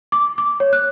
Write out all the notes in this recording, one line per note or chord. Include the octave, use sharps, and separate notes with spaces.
D6
D6
C#5
F#6